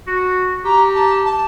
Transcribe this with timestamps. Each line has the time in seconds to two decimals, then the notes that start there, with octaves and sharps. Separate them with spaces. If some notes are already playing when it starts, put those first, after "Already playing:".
0.07 F#4
0.65 G4 A#5
0.94 A5
1.25 A5